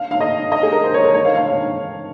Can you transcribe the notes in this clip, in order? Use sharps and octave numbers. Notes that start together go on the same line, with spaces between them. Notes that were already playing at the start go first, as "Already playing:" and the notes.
Already playing: F5
F5
D#5
D#5
G#4
A#4
C5
C#5
A#4
C#5
F5
F5
F5